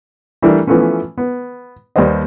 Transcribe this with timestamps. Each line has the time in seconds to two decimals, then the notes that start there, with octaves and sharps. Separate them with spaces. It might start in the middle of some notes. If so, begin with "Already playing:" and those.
0.43 E3 G3 A3 D4 E4 A#4
0.67 E3 F3 A3 B3 C#4
1.18 B3
1.96 D#2 G3 B4 C5 D#5